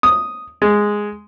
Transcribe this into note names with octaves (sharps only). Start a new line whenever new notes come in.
D#6
G#3